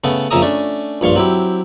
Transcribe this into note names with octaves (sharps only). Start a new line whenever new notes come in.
C#3 A3 B3
F2 C#3 A#3 E5 A#5 D#6
A3 C#4 D4
A#1 G2 C#5 F5 C6
F#3 C4 E4 G4